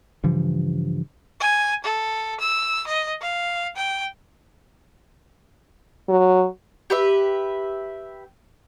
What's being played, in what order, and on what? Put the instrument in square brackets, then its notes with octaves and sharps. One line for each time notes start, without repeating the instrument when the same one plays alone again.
[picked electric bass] G2 C#3 E3 F3
[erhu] G#5
A4
E6
D#5
F5
G5
[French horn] F#3
[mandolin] G4 B4 E5